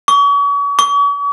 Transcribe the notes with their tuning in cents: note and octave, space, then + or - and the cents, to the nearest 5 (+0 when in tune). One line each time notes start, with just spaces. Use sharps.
C#6 +40
C#6 +45